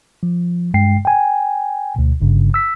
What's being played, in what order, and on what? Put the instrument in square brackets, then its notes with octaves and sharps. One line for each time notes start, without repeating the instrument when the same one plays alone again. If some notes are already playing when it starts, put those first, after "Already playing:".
[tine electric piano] F3
G2 G#3 G5 C7
G5 G#5
D2 B2
G1 G2 C#3
E6 B6